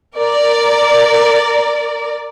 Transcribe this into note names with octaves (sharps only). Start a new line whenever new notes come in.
A#4 D5